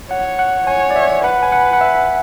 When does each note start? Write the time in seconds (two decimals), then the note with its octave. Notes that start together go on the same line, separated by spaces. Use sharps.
0.10 C#5 F#5
0.39 F#5
0.67 C#5 G#5
0.91 D5
0.96 E5
1.24 B4 F#5
1.43 G#5
1.52 F#5
1.73 F#5
1.81 E5